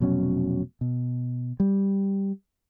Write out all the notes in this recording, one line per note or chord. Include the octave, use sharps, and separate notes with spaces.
F1 B2 F#3 C#4
B2
G3